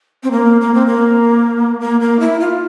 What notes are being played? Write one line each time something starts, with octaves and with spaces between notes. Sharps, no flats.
C4
A#3
A#3
C4
A#3
A#3
A#3
E4
F4